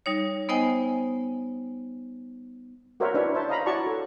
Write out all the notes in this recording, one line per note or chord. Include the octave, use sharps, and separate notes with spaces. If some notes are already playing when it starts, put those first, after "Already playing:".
G3 D#4 C#5
B3 D#4 C5 D#5 G5 G#5
F#4 A#4 C5 C#5 E5 F#5
D4 E4 B4 C#5 E5
C5 E5 A5
D#5 F5 A#5 B5
E4 F#4 C#5 D5 A5 C#6
A4